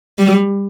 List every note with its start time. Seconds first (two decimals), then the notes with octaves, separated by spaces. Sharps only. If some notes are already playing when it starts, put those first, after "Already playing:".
0.19 G3